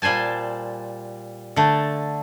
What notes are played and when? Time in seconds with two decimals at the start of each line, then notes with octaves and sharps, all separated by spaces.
0.02 A#2 G3 C5 G#5 A5
1.56 D3 A3